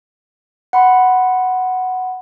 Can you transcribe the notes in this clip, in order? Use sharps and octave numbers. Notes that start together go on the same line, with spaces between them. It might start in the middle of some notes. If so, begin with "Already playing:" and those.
F#5 B5 C6